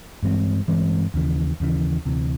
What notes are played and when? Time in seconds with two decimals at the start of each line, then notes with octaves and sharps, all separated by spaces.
0.23 G2 E3 G#3 C4
0.68 G2 E3 G#3 C4
1.14 D#2 C#3 E3
1.60 D#2 C#3 E3
2.05 D2 C3 E3